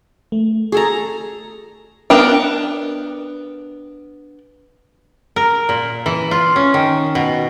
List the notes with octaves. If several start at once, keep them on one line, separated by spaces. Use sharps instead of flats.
A3
G#4 A4 A#5 C#6
B3 D4 A#4 G5
A#4
A#2
E3
F4
C#4
D#3
B2